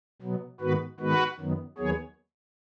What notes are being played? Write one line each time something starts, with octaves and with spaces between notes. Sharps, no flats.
B2 F#3 B3
G#2 D#3 B3 F#4 B4
G#2 D#3 G#3 B3 F#4 B4
F#2 D#3 F#3 B3
D#2 D#3 F#3 B3 G#4 C#5